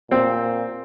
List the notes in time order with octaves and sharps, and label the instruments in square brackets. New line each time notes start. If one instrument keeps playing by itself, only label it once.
[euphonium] A#2 [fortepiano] C4